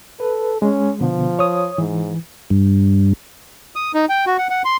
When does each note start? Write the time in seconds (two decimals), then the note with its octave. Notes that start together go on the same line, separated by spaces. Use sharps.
0.20 A4 B4
0.62 G#3 C#4
1.01 B2 D3 F3 B3
1.39 C#5 D#6
1.78 G#2 E3
2.50 G2
3.76 D#6
3.95 D#4
4.09 G5
4.27 F#4
4.38 F#5
4.50 F#5
4.65 C6